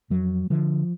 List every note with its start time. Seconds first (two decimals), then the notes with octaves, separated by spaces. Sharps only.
0.10 F2 F#3
0.50 D3 F3